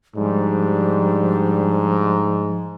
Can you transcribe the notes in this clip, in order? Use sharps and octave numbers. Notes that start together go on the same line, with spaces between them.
G#2 F3 G3 D4 D5